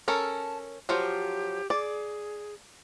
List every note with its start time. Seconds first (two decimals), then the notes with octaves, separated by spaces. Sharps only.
0.08 C#4 A4 A#4 A5
0.89 F3 F#3 F4 G4
1.70 G#4 D5